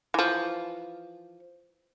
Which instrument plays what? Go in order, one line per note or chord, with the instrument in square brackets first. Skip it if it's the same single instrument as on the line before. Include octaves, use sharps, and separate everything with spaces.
[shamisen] E3 F3